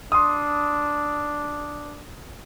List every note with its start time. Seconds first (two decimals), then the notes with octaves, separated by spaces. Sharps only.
0.12 D4 C6 D#6